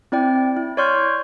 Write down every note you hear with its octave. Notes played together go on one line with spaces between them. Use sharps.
C4 E4 D5 G5
E4
C#5 D5 C6 C#6 F6 G6